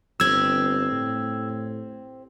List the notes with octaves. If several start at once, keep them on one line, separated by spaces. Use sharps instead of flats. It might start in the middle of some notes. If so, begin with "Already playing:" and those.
G1 C4 G4 E6 G#6
A2